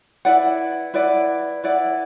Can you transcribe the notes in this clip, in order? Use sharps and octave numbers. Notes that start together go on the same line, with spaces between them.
E4 B4 D5 F#5
E4 B4 D5 F#5
E4 B4 D5 F#5